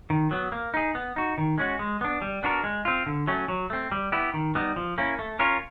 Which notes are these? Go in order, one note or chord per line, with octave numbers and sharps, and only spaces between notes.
D#3
F#3 B3
A#3
D#4 G#4
B3
D#4 F#4
D#3
G#3 C#4 F#4
G#3
B3 D4
G3
B3 D4 F#4 A#4
G#3
C4 F4
D3
F#3 A3 C#4
F#3
A3 C4
G3
B3 E4 G4
D#3
G3 B3 D#4
F3
A#3 C#4 E4
A3
C#4 F4 A#4 C#5